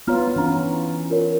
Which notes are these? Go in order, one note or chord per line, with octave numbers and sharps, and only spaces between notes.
B3 F4 C#5 A#5 F6
E3 C#4 D4 A#5
F4 A#4 C#5